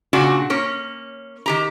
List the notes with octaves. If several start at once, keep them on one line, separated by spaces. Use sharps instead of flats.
A#2 C#3 D4 F#4
A#3 C#4 C#5
D#3 G4 A#5